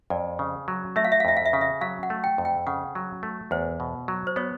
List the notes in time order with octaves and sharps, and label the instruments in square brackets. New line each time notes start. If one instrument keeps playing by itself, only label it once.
[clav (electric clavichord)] F2 [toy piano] D5
[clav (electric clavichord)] C#3
F#3
[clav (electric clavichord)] A3 [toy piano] E5
[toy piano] F5
E5
F5
[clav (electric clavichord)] F2 [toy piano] E5
[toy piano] F5
E5
[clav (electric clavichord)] C#3 [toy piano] F5
[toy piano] E5
[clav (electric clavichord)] F#3 [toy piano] F5
[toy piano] F#5
[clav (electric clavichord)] A3
[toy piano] G5
[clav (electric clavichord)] F2
[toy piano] G5
[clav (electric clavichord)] C#3 [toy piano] F#5
[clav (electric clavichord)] F#3
A3
[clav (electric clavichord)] E2 [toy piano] C5
[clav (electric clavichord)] B2
F#3
[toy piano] C5
[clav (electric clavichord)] B3 [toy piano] C#5